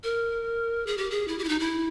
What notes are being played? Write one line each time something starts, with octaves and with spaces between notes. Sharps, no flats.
A#4
G#4
G4
G#4
E4
G4
E4
D#4
E4